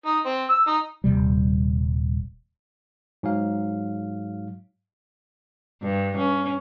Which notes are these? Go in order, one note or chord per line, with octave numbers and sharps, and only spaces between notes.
D#4
C4
E6
D#4
D#1 C3 G3
G#2 F#3 F5
G2
C#4